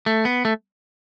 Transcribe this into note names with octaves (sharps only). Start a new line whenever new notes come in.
A3
B3
A3